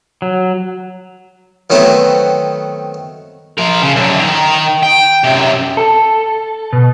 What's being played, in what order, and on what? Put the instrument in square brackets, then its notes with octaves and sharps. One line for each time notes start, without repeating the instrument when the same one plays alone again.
[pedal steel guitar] F#3
[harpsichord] D#3 F#3 A3 B3 C4
[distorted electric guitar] F3 A#4
C#3
F#2 D3
D#3 A#5
G5
F#2 C3
[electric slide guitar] A4
B2